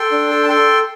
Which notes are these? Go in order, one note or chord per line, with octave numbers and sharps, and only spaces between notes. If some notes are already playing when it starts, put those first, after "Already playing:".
Already playing: A4 G5 C6
D4
A4
A5
A4 G5 C6